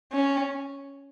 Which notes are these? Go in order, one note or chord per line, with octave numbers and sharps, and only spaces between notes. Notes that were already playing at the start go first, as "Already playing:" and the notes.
C#4